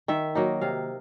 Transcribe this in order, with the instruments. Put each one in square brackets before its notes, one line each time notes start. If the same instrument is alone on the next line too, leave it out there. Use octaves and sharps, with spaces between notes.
[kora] D#3 E5
F#3 A#3 D#4
C3 F5